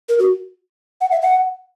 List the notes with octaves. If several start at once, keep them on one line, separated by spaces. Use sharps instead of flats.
A#4
F#4
F#5
E5
F#5